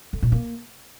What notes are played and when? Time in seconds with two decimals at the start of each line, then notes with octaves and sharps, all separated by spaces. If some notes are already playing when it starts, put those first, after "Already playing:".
0.13 D3
0.22 A#2
0.32 A#3